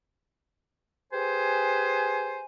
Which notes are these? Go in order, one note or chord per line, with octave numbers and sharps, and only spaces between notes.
G4 G#4 B4 C5 G#5